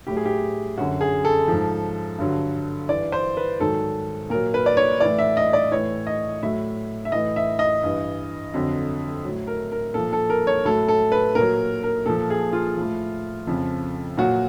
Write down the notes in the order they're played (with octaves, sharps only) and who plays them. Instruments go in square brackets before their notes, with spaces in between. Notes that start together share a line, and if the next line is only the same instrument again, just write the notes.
[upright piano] A2 F#3 G4
G#4
G4
F#2 D3 F#3 F#4
G#4
A4
G#2 F3
G2 D3 F#3
G2 E3 D5
C5
B4
G#2 D#3 F#3 A4
A#2 F#3 A#4
B4
D5
C#5
A2 E3 D5
E5
D#5
D5
A2 E3 C#5
D#5
A2 F#3 E5
E5
A2 E3 D#5
E5
D#5
G2 E3
F2 D3 F#3
A2 F#3
A#4
A#4
A#2 F3 A4
A4
A#4
C#5
A2 F#3 A4
A4
B4
A#2 A#4
F#3
A#4
A#2 F3 A4
G#4
F4
A2 F3
F2 C#3 F3
A#2 F#3 F#4